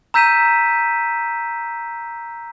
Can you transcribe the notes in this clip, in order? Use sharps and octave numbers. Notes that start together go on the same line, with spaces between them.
A#5 E6 G6 B6 D#7 E7